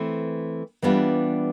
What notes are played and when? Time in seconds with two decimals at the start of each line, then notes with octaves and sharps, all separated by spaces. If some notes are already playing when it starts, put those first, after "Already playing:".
Already playing: E3 A3 C4
0.82 E3 G3 B3 D4 F4